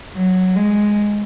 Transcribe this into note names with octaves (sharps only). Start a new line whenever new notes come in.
F#3
G#3